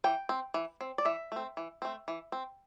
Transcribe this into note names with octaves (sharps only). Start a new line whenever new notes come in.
E3 G5
C4
E3
C4
D5
E3 E5
A3 C4
E3
A3 C4
E3
C4